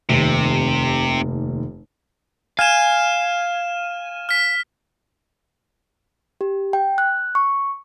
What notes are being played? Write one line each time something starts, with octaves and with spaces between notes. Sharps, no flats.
F1 D#2 C3
F5 G#5 F6 E7
F6 B6
G4
G5
F#6
C#6